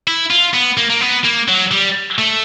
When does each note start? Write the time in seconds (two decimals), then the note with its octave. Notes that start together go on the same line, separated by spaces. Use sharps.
0.08 E4
0.31 F4
0.54 B3
0.77 A#3
0.90 A#3
1.01 B3
1.24 A#3
1.48 F#3
1.71 G3
2.19 A3